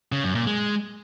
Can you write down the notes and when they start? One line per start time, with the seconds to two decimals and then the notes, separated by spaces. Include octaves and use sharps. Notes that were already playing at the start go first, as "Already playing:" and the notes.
0.12 C#3
0.24 F#2
0.35 A#2
0.46 G#3